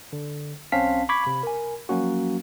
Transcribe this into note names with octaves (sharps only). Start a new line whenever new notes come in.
D3
B1 C4 C#4 F5 A5 B6
B5 C#6 D6 G#6 B6
C3 B5
A#4 G#5
F3 F#3 A#3 C#4 F#4